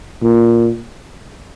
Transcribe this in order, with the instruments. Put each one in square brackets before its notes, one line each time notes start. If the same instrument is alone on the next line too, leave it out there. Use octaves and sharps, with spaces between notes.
[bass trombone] A#2